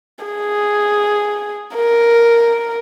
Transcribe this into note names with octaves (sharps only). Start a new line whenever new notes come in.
G#4
A#4